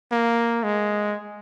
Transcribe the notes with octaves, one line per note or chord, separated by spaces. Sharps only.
A#3
G#3